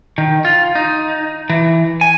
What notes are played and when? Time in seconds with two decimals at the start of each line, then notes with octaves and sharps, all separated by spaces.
0.18 D#3
0.45 F4
0.75 D#4
1.50 E3
2.01 G#5